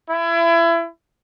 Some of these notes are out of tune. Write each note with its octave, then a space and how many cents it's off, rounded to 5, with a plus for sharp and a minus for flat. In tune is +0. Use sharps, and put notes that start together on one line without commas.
E4 +30